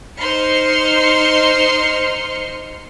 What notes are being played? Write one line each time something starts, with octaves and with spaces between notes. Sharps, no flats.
D#4 C5 D#5 C6 F6 C#7